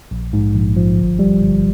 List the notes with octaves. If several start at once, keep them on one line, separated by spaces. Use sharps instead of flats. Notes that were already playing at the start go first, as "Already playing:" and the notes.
A#1
G#2
A#1
F3
G1
G3
G1